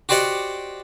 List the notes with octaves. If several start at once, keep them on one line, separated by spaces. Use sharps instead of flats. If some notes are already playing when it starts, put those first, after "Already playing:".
F#4 G4 C5 D5 D#5 F#5